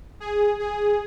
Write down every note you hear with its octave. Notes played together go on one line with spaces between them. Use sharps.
G#4
G#4